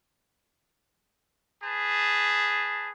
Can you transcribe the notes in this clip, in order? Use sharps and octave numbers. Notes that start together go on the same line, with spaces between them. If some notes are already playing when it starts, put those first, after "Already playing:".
G#4 B4 A5